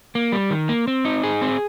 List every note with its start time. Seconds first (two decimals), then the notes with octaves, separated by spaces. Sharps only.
0.15 A#3
0.32 G3
0.51 D#3
0.69 A#3
0.88 C4
1.05 D#4
1.23 G#4
1.42 C4